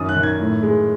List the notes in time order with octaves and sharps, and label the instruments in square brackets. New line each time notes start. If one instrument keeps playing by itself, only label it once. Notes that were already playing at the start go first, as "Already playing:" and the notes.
Already playing: [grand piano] F#2 D#3 D#6
F#6
D#3
G#6
A2
G#3